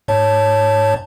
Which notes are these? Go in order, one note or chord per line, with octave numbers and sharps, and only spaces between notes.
G#2 C#5 A5